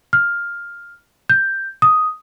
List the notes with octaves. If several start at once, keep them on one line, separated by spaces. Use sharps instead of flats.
F6
G6
D#6